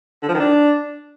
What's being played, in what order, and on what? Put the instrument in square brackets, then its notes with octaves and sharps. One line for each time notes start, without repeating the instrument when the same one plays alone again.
[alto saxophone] D3
F3
D#3
D4